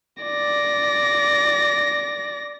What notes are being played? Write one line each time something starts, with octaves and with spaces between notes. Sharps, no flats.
D5 A#6